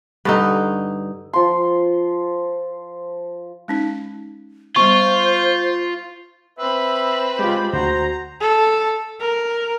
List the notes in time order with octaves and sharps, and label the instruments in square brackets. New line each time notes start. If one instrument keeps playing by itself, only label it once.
[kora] G2 D3 D#4
[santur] F3 C6
[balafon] G#3 C#4 D#4
[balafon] G3 B3 [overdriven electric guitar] F4 [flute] C5 [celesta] C#6
[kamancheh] C4 B5 [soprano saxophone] B4 [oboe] E5
[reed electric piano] G#3 F4 [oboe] G4
[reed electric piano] D2 F#4 [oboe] C5 [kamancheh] A#5
[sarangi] A4
A#4